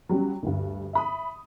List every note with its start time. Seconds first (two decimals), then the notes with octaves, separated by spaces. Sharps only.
0.09 F#3 G3 C#4
0.43 D2 G2
0.93 E5 B5 D#6